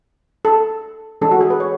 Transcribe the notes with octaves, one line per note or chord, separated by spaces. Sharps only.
A4
E3 G#3 C#4 A4
F#4
G#4
B4
C#5